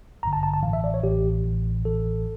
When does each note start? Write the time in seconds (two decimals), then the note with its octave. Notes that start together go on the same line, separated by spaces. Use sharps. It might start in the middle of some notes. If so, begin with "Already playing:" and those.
0.23 A1 G2 D3 A#5
0.33 A5
0.43 A5
0.54 A5
0.63 A1 A2 E3 F5
0.73 E5
0.84 D5
0.94 C#5
1.03 A1 A2 E3 G4
1.44 A1 A2 E3
1.85 A1 A2 E3 A4